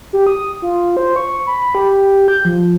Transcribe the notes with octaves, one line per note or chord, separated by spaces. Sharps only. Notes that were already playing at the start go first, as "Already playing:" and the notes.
G4
D#6
F4
C5
C#6
B5
G4
G6
F3